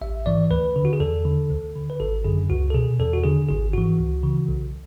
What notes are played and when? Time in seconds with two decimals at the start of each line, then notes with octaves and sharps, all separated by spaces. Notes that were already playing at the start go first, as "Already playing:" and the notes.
0.01 A1 E5
0.26 G#2 E3 D5
0.51 D2 B4
0.76 D3
0.85 F#4
0.93 G#4
1.00 E2 A4
1.25 D3
1.50 D2
1.75 D3
1.90 B4
2.00 G#1 A4
2.24 F#2 D3 G#4
2.50 C#2 F#4
2.70 A4
2.74 B2 G#4
2.99 E2 A4
3.13 F#4
3.24 D3 G#4
3.49 G#1 G#4
3.73 G#2 E3 F#4
3.99 C#2
4.23 C#3 E3
4.48 B1